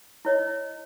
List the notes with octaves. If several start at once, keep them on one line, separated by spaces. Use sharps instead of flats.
E4 C#5 D#5